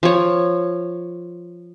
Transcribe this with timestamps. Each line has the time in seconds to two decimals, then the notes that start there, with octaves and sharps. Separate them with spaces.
0.03 F3 C#5